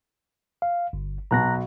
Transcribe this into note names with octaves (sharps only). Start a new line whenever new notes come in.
F5
G1
B1 B2 A#5 F#6 A#6